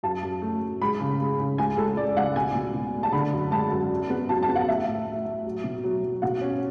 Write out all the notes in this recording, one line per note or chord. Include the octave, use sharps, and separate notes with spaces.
F#2 A5
F#2
A3
A3
G#3 B5
C#3
G#3
C#3
C#2 G#5
C#2 A4
C#2 D5
C#2 F#5
B2 G#5
B2
B2
A3
A5
D3 B5
F#2
G#3 A5
F#2
F#3
B3
F#3 A5
A5
B3
F#5
A2 E5
A2
A2
A2
F#3
B2
F#3
F#3
B2 F#5
C#4